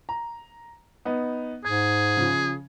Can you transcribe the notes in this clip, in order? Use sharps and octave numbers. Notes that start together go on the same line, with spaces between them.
A#5
B3 D#4
G#2 G#4 G#6
C#3 F3